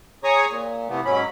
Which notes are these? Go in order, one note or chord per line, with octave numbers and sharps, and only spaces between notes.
G#4 C#5 G#5 A#5 C#6 D#6
A#2
C3 E3 A3 B3
G#2 F#3 C#4 B5